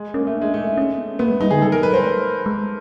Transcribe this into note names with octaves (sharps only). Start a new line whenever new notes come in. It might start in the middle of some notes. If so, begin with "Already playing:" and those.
Already playing: G#3
A#3 C#4
A3
D4
G#3
A3 D#4
C#4
B3
A#3 B3
G#3
G3 D#4
D3 G#4
C#3 A4
F3 A#4
F#3 B4
G3 C5
A3
G#3